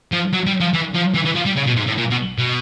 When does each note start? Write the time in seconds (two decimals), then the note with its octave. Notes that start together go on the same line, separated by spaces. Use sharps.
0.12 F3
0.33 F#3
0.46 G3
0.60 F3
0.74 E3
0.95 F3
1.15 E3
1.26 E3
1.36 F3
1.46 G3
1.57 C#3
1.67 B2
1.77 G#2
1.87 A2
1.98 A#2
2.11 B2
2.39 B2